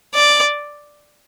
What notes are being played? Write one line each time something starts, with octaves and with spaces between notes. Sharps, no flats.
D5